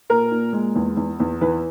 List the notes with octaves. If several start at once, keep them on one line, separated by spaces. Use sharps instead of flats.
A#2 A#4
A#2
G#3
E2
E2
E2
E3 B4